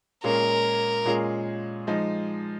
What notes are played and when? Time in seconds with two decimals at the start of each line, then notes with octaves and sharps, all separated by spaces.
0.24 A#2 G#3 C#4 F4 G#4 A#4
1.05 A#2 G#3 C#4 F4 G#4
1.87 F3 G#3 D#4